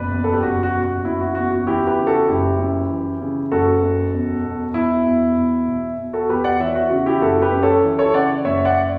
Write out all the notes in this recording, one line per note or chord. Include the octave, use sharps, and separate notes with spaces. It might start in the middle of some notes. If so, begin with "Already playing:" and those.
Already playing: F#1 B2 B4 D5
E2
A4
G4
F#1 F#4
F#4
B2
F#4
F#1 E4
F#4
E2 F#4
F#4
E3 E4 G4
G4 B4
C#3
F#4 A4
F#1 E4 G4
F#2
E3
C#3
F#1 F#4 A4
F#2
E1
B2
E1 E4
E2
E1
B2
E1
F#4 A4
E2 G4 B4
D5 F#5
E3 C#5 E5
F#4
C#3 F#4
E4 G4
F#1 F#4 A4
G4 B4
F#2
A4 C#5
E3
A4 C#5
C#3 D5 F#5
F#1 C#5 E5
D5 F#5